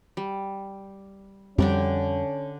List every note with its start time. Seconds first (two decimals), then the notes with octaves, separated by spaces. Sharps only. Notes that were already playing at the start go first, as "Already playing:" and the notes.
0.17 G3
1.58 F2 D3 G3 C#4 D4 G4